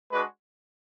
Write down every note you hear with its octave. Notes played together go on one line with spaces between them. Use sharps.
G#3 D4 F#4 B4